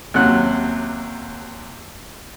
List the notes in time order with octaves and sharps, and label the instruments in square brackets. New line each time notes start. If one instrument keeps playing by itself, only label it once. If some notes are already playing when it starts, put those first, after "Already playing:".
[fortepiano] D#2 C3 F#3 C#4 F#5 F#6